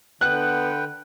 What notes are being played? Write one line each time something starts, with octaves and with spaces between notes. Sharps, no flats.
D3 B3 B4 G5 F#6